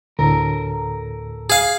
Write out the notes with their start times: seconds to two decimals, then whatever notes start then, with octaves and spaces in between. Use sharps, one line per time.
0.19 D2 A2 A4 A#4
1.50 G#4 F5